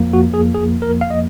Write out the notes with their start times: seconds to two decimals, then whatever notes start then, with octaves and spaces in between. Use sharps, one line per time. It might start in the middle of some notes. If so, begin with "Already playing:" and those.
Already playing: F2 F3 A#3
0.13 F#4
0.34 G#4
0.55 G#4
0.82 A#4
1.01 F5
1.10 D#5